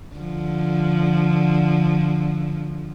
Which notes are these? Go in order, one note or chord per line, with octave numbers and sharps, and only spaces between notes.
D3 F3